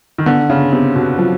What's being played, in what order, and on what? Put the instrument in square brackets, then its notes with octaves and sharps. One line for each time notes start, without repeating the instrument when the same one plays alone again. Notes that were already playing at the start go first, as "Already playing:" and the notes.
[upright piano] D#3
[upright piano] D3 [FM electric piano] B3
[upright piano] C#3
[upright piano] C3 [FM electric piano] B3
[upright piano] B2
[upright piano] F3 [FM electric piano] F#3